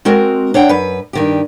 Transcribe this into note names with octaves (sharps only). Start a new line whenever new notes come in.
G#3 C4 F#4 A#4
D4 C#5 F#5 G5
F#2 B4
G2 D#3 G4